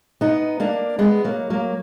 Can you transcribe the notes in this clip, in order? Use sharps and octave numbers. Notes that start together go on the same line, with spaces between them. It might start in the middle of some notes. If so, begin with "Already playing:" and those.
B3 D#4
A#3 D4
G#3 B3
F#3 A#3
F#3 A#3